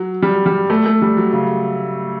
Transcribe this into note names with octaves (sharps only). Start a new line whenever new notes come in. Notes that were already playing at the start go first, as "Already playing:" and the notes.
Already playing: F#3
G3
G3
A3
A3
G3
F#3
C#3